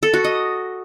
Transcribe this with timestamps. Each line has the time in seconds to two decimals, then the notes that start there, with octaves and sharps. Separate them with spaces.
0.03 A4
0.14 F#4
0.24 D#5